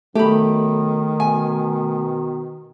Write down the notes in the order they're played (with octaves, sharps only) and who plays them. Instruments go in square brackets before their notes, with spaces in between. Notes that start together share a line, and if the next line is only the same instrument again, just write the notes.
[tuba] B1 [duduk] D#3 [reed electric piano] A3 [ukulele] G4 B5
[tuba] B2 [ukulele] G#5